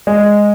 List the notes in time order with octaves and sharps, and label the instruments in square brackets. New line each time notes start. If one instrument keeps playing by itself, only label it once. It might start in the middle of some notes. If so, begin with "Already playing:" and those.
[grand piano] G#3